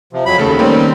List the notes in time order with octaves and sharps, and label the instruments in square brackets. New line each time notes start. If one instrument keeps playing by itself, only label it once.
[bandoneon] C3 F3
F2 F#3 B5
[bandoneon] D#2 [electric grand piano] C#3 A3 A4
[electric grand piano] D#3 A#3 C#4 [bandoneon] G3 C4